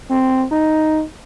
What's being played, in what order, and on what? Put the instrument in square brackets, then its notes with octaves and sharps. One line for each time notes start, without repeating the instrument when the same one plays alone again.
[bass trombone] C4
D#4